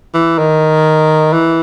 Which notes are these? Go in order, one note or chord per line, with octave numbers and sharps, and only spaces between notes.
E3
D#3
E3